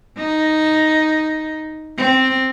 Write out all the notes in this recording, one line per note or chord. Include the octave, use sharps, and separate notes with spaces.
D#4
C4